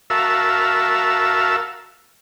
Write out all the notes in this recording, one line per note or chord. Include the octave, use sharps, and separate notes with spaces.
F#4 A#4 E5 F5 A5 E6